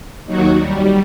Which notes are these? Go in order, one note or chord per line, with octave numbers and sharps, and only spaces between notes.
D#2 D#3 F#3 F#4
G3